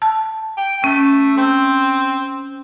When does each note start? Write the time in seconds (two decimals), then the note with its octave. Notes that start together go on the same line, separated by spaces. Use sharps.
0.02 A5
0.57 G5
0.84 A3 C#4
1.38 C4